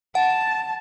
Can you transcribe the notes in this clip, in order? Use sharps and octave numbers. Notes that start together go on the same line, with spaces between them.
F#5 A5